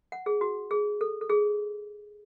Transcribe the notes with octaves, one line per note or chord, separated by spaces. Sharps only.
F#5
G#4
F#4
G#4
A4
A4
G#4